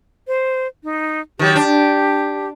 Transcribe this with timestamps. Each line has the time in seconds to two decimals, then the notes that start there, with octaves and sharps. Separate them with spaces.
0.28 C5
0.84 D#4
1.39 D#3 F3 F#3 G4
1.56 D4